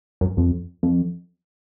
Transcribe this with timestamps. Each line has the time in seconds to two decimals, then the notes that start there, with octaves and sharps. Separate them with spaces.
0.21 F#2
0.37 F2
0.83 F2